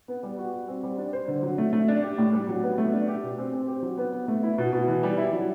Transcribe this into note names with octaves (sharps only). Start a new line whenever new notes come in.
B3
G3
F#4
F#4
C4
G3
D4
C5
D3
F#3
A3
A3
D4
G4
A2
G3
F#3
B3
A3
D4
G4
B2
C4
C4
G4
F#3
B3
B3
A3
E4
B2
B2
E3
G3
E4
F#3